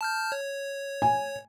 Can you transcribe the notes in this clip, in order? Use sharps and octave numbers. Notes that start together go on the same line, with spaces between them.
A5 F6 G6
C#5
G#5